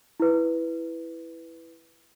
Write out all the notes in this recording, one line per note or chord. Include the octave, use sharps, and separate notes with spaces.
E4 B4